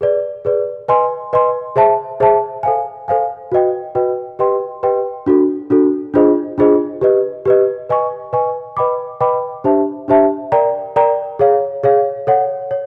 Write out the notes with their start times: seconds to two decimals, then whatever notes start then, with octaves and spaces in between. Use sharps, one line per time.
0.01 G#4 B4 D5
0.45 G#4 B4 D5
0.88 B4 D#5 G#5 C6
1.33 B4 D#5 G#5 C6
1.76 G#4 C5 E5 A5
2.20 G#4 C5 E5 A5
2.63 A4 C5 F5 G#5
3.08 A4 C5 F5 G#5
3.52 F#4 B4 D#5 G5
3.95 F#4 B4 D#5 G5
4.39 G4 B4 D#5 G5 C6
4.83 G4 B4 D#5 G5 C6
5.26 D4 F#4 A4
5.70 D4 F#4 A4
6.14 D4 F4 G#4 C5 D#5
6.58 D4 F4 G#4 C5 D#5
7.01 G4 B4 D#5
7.45 G4 B4 D#5
7.89 B4 D#5 G#5 C#6
8.33 B4 D#5 G#5 C#6
8.77 B4 D#5 G5 B5 D6
9.21 B4 D#5 G5 B5 D6
9.64 D4 G4 C5 E5 A5
10.08 D4 G4 C5 E5 A5
10.52 A#4 D5 G5 A#5
10.96 A#4 D5 G5 A#5
11.39 G#4 C#5 F5
11.84 G#4 C#5 F5
12.27 A4 C#5 F#5
12.71 C#5